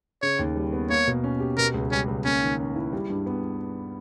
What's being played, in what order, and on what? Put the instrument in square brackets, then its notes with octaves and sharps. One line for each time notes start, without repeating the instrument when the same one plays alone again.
[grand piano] C#3 [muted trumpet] C#5
[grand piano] D#2
G3
B3
[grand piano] A#3 [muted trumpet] C#5
[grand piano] B2
C#4
G4
[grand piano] B2 [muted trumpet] A#4
[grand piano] C#2
[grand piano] G3 [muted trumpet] C#4
[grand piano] C#2
[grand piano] A#3 [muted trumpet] C#4
[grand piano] D#3
C#4
E4
G3
G2
B3